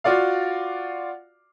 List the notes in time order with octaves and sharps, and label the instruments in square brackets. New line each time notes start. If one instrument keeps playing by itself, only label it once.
[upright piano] F4 F#4 D5 F5